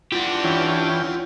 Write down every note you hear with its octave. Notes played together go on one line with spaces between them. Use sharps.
D4 E4 F4 G4 F#5
E3 C#4 G5